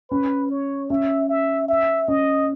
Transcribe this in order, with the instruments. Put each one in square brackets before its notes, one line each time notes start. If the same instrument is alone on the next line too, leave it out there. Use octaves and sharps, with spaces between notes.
[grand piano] C#4 [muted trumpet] B4
[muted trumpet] C#5
[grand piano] C#4 [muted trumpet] E5
[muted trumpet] E5
E5
[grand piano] C#4 [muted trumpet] D#5